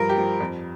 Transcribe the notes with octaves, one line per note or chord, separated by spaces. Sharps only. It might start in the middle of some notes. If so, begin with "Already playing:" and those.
Already playing: G2 F3 A#4
G4
F3
F2